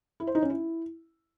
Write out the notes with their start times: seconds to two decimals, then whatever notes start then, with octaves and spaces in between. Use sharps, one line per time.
0.20 E4
0.27 C5
0.35 D#4
0.42 C#4
0.50 E4